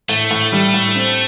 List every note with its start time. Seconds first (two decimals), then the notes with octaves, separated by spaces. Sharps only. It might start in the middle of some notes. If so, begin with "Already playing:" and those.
0.09 A2 A3
0.31 A2
0.52 G3
0.74 A2
0.95 C4